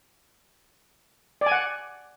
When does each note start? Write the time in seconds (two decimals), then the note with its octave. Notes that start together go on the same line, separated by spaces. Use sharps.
1.41 D5
1.46 G#5
1.52 F#5